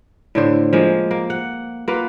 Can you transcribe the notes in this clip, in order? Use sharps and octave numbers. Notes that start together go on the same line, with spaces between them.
A2 D3 C5
F3 G#3 A#3
A#3
F#5
A#3 F4 B4 F#5